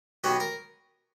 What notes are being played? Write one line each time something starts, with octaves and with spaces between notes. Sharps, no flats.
B1 B2 F#3 B3 G4
A#4